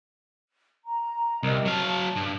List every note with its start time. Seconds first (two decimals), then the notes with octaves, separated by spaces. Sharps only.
0.84 A#5
1.43 C2 G4 A#4 D#5
1.65 F#3 F5 A5
2.16 G2